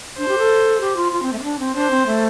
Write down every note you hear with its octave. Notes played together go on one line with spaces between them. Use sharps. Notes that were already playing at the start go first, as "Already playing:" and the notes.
D4 C5
G4
A4
G4
F4
F4
C4
A3
C4
D4
C4
D4 C5
C4
A3